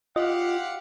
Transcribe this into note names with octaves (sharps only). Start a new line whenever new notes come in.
F4 G4 D#5 F5 F#5